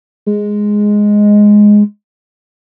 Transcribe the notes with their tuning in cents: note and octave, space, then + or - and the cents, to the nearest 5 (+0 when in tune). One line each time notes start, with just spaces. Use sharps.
G#3 +0